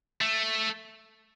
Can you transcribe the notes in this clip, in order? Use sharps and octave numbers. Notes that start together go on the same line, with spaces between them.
A3